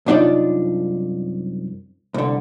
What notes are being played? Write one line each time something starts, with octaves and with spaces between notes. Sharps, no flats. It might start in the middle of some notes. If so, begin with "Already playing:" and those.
C2 F#2 D4 D#4 F4 D5
C2 D3